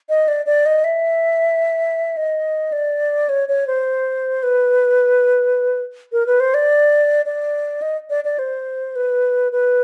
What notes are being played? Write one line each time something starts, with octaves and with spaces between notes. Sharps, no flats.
D#5
D5
D5
D#5
E5
D#5
D5
C#5
C#5
C5
B4
A#4
B4
C5
D5
D5
D#5
D5
D5
C5
B4
B4